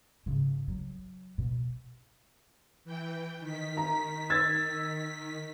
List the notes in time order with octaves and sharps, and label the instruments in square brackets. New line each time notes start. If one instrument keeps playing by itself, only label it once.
[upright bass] G#2 C#3
F#3
B2
[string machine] E3 G5
D#3 B6
[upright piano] A#5
E6 G#6 A6